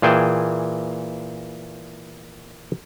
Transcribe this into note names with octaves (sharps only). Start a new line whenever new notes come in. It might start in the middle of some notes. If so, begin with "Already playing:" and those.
A#2 E3 G#4 G5 A5